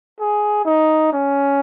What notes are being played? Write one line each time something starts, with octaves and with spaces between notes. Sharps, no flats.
G#4
D#4
C#4